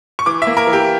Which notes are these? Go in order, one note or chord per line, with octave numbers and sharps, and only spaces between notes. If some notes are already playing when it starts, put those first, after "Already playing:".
C#6
E3 D6
A#3 E5
A#4
E3
G4